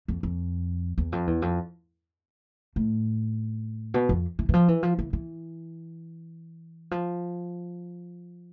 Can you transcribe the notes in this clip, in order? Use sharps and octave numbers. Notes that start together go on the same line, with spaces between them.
F2
F2
E2
F2
E2
F2
A2
B2
F2
E3
E3
F3
E3
F3
E3
E3
F3